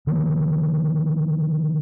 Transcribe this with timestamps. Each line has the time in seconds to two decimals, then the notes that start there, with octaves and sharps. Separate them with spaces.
0.07 D3 D#3 F3 A#3